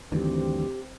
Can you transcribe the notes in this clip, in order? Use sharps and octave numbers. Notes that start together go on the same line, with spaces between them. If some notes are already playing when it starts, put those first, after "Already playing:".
D2 G2 D#3 E3 C4 G4